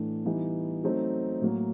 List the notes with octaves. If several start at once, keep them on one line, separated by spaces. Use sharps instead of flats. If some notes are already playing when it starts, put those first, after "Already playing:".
Already playing: A2 E3 A3 D4
E3 G3 B3 D#4
F#3 A3 C4 D#4
A2 F#3 A#3